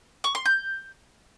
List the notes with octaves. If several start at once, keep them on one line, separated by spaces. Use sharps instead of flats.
C#6
C6
G6